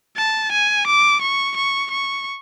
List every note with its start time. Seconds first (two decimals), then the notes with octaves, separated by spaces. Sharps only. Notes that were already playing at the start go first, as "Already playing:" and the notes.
0.17 A5
0.52 G#5
0.87 D6
1.22 C#6
1.56 C#6
1.91 C#6